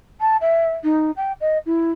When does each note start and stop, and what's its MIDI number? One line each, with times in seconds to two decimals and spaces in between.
0.20 0.37 81
0.41 0.72 76
0.84 1.11 63
1.16 1.32 79
1.40 1.58 75
1.66 1.91 64